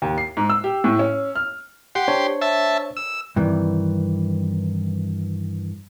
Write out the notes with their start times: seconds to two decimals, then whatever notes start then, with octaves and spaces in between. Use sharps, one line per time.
0.02 D#2
0.18 C7
0.37 G#2
0.49 E6
0.64 G4
0.84 A2
0.99 C#4
1.36 F6
1.95 G4 F#5 C6
2.08 D4 C5 C#5
2.42 E5 A5
2.97 E6
3.36 G2 C3 D#3 E3